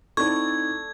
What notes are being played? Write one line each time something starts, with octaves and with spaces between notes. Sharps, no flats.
C4 D#4 E4 A4 D5 C#6 G#6